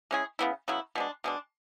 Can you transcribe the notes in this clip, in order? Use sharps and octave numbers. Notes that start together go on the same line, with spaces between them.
G#3 C#4 E4 G#4
C#3 F#3 B3 E4
C#3 F#3 B3 E4
B2 G#3 D4
B2 G#3 D4